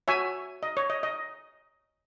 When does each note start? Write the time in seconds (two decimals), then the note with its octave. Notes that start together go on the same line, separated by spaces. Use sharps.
0.08 F#4 C#5 E5 G#5
0.63 D#5
0.77 C#5
0.90 D#5
1.03 D#5